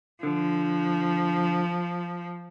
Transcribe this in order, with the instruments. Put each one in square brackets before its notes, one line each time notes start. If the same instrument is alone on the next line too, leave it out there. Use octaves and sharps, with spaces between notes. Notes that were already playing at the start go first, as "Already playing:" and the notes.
[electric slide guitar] D3 [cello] F3